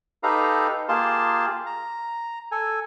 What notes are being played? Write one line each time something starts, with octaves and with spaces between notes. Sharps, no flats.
D#4 G4 A4 B4 F5 A#5
A#3 F4 G4 G#4 A5 C6
A#5
A4 G#5